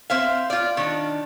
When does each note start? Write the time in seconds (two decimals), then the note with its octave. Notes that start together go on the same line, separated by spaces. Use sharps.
0.10 C4 C5 E5 F5
0.50 F4 D5
0.77 D#3 D4